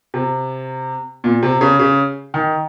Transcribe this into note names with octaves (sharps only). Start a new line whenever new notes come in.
C3
A#2
C3
C#3
C#3
D#3